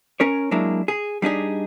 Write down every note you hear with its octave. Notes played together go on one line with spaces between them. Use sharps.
C#4 A#4 C#5
F#3 G#3 A#3 D4 E4
G#4
G3 D4 D#4 G#4